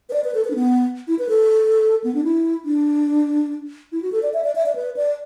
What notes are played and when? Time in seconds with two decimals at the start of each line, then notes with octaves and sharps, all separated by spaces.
0.09 B4
0.13 D5
0.24 B4
0.34 A4
0.45 B4
0.50 D4
0.55 B3
1.07 E4
1.19 B4
1.29 A4
2.04 B3
2.15 D4
2.24 E4
2.65 D4
3.92 E4
4.02 F#4
4.12 A4
4.23 D5
4.34 E5
4.44 D5
4.55 E5
4.66 D5
4.75 B4
4.97 D5